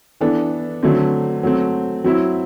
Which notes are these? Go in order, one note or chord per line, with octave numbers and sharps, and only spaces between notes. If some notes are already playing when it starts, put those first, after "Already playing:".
E3 B3 D4 A4
D3 F#3 A3 C4
F#3 A3 C4
F#3 C4 E4